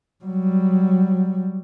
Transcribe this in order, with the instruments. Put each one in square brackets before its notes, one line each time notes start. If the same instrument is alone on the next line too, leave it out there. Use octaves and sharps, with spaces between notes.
[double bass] F#3 G3